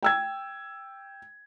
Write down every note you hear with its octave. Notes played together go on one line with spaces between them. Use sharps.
G5 E6 G#6